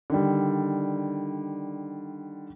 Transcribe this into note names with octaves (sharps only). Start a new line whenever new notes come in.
D3 D#3 G3